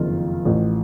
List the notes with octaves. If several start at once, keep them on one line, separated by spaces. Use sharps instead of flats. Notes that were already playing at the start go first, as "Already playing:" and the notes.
Already playing: F#1 F2 D#3 F4
A1 A2 F3